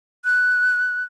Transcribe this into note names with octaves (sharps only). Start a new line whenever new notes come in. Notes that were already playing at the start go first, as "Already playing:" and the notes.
F#6